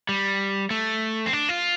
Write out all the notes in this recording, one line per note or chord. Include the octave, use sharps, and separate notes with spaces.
G3
A3
C4
D4
F4